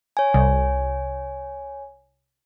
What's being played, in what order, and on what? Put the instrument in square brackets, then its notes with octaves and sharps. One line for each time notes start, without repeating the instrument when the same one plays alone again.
[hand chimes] C#5 G#5
[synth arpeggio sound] C2